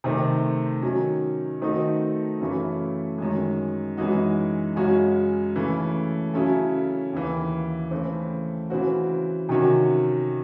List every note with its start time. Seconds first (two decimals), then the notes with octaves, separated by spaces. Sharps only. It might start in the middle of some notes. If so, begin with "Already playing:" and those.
0.04 C3 D#3 A3 C4
0.82 D#3 F#3 C#4
1.62 D#3 A3 C4 D#4 F#4
2.40 F#2 C#3 E3 A3
3.18 F#2 D#3 G#3
3.97 F#2 E3 G#3 D#4 F#4
4.76 F#2 C#3 G#3 C#4 F#4
5.56 C#3 E3 A3
6.34 C#3 F#3 C#4 E4 A4
7.13 D#2 C#3 E3
7.91 C#3 E3 A3 C4
8.70 C#3 E3 C4 F#4
9.49 C3 D#3 F#3 C#4 F#4